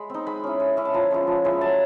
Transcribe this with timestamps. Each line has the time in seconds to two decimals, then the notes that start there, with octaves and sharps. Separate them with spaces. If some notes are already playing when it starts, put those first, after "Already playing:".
Already playing: G#3 B5
0.10 C4 D#4
0.27 G#3 B5
0.44 C#4 E4
0.60 G#3
0.77 C#4 E4
0.85 A5
0.94 F3 A#5
1.11 G#3 C#4 E4
1.27 F3
1.44 G#3 C#4 E4
1.61 F#3 A5